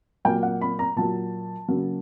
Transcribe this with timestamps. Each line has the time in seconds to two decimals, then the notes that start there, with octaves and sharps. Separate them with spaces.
0.25 A#2 F#3 A#3 G5
0.43 F#5
0.61 B5
0.79 A#5
0.96 A#2 F#3 A#3 A5
1.68 C#3 F#3 A#3